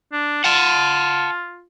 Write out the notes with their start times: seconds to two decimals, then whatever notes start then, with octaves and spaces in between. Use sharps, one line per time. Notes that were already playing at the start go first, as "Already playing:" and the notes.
0.12 D4
0.44 F4 F#5 A5